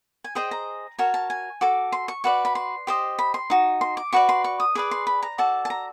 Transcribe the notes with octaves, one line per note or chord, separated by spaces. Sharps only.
G#5
G#4 C5 D#5 G5
A#5
F#4 A#4 C#5 A5
A5
G#5
F#4 A4 D6
C6
C#6
F#4 B4 D5 C#6
B5
C6
G4 C5 D#5
B5
C6
D#4 F#4
C6
D6
F#4 B4 D5 C#6
C6
C#6
D#6
G#4 B4 D5 D6
C6
B5
A#5
F#4 A4 D5 A5
A5
A#5